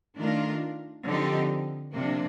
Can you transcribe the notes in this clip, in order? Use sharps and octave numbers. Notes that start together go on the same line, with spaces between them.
D#3 A3 D4 F4 A#4
D3 F3 C4 D#4 G4
C3 F3 A#3 D4